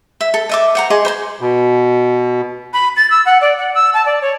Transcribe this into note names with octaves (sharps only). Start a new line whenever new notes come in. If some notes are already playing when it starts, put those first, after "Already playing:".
E5
A4
D#5 E5 D6
C5 F#5 A#5
G#4 D#5 C6 D6
C5 B5 C6
B2
B5
A6
E6
F#5
D5
F#5
E6
A5
D5
C#5